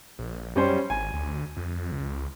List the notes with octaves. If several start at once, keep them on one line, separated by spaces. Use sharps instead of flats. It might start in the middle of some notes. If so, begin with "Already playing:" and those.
A#1
F#2 G3 C#4 C5
G#1 G#5
D2
F2
C#2